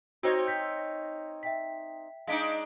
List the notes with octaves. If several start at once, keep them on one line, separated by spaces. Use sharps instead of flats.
C4 D#4 F#4 C5 C#5
G6 B6
E5 G5 B6
G#3 D4 D#4 F5 B6 D7